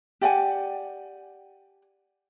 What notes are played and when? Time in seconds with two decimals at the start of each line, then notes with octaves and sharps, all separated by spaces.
0.21 G4 D5 F#5 G#5